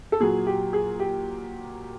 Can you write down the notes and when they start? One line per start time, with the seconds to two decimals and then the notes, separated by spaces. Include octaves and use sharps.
0.12 A4
0.20 A#2 F#3 G#4
0.47 G4
0.73 G#4
1.00 G4